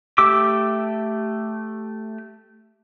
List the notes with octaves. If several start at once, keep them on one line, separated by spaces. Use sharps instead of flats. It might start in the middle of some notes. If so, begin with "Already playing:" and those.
A3 G4 D6 E6